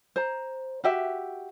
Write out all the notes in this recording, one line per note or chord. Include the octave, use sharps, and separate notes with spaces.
C5 A#5
F#4 G4 E5